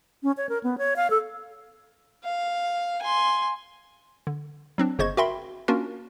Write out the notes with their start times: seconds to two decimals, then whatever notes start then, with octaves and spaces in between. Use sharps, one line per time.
0.23 C#4
0.37 C#5
0.49 A#4
0.64 B3
0.78 C#5
0.96 F5
1.10 A4
2.24 F5
3.02 G#5 C6
4.27 D3
4.78 F#3 C4 D4
4.99 G1 C#3 C5 D#5 C#6 G#6
5.17 F#4 A#4 E5 G5 B5 C6
5.68 A#3 C#4 D4 F4 F#4 A#4